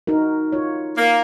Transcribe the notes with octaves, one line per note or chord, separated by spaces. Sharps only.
D#4 F#4 A#4
F4 C#5
A#3